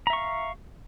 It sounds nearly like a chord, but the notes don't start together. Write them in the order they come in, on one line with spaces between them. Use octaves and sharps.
A#5 E5 C#6 F5